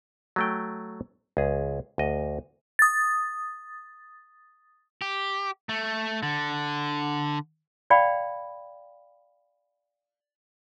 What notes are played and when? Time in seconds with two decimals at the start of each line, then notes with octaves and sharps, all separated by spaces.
0.36 F#3 A3 G5
1.37 C#2 G#4
1.98 D2 D#5
2.79 D#6 A6
5.02 G4
5.69 A3
6.23 D3
7.90 D5 F5 G5 B5